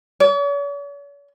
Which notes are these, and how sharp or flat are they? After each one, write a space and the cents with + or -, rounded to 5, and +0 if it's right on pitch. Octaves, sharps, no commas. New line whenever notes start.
C#5 +45